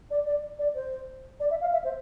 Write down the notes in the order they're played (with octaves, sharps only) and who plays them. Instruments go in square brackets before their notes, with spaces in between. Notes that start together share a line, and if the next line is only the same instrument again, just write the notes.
[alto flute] D5
D5
D5
C5
D5
E5
F5
E5
C5